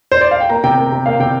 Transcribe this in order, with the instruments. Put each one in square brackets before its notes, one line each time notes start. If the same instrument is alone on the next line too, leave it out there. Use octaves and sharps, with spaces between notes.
[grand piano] C5
D5
F5
G5
A#3 A#5
C3 G5
A#3
C3
A#3 F5
C3 G5